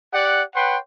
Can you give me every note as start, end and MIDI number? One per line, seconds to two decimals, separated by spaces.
0.13 0.43 67
0.13 0.43 74
0.13 0.43 78
0.55 0.78 71
0.55 0.78 73
0.55 0.78 78
0.55 0.78 79
0.55 0.78 84